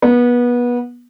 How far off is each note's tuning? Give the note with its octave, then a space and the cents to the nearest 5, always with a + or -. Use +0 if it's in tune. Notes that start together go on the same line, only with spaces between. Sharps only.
B3 -25